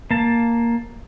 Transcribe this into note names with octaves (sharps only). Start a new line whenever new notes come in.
A#3 A5